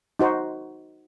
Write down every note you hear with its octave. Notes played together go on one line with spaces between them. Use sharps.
D#4 F#4 C5